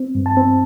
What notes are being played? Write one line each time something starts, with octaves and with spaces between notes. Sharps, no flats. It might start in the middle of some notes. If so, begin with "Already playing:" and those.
Already playing: C4
G2
A5
C4